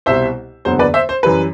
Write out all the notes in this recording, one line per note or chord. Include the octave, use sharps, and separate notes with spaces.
C2 B2 G3 C5 E5
F#1 E2 D3 F#3 B3 C5
B4 D5
C5 E5
C5
F#2 E3 G3 B4